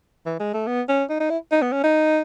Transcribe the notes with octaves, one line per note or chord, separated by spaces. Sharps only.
E3
G#3
A3
B3
C#4
D#4
D#4
E4
D#4
B3
C#4
D#4